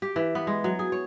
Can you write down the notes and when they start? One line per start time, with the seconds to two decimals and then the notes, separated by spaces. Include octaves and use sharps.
0.02 G4
0.16 E3
0.35 B3
0.47 G#3
0.64 F#3
0.79 G#4
0.92 C#5